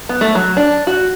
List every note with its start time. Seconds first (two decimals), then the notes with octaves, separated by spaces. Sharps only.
0.09 B3
0.21 A3
0.35 F#3
0.57 D4
0.87 F#4